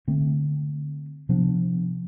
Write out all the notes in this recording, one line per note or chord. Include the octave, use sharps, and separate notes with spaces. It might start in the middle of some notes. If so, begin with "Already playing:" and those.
D3 A3 C4
C3 F3 B3 D4